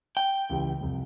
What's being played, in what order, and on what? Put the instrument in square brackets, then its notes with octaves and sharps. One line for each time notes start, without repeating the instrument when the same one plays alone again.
[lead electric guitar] G5
[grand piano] C#2 E3 G4
C2 F2